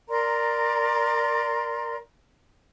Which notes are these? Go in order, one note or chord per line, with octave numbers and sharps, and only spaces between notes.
A#4 D5 A#5 C6